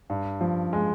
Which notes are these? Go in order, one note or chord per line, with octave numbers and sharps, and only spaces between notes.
G2
F3
G#3